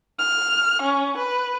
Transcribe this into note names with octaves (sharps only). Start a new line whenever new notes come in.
F6
C#4
B4